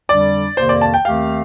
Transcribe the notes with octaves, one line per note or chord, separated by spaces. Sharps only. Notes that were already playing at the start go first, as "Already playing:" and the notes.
F2 D3 G3 D4 D5
F2 C3 D#3 A#3 C5
D5
A5
G5
D#2 D#3 A3 C4 G4 F5